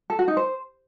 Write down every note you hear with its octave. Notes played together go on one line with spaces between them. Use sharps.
A4
F#4
D#4
C5